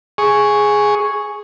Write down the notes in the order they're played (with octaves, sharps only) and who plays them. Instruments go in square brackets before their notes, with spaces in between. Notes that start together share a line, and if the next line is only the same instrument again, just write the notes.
[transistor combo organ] G#4 C#6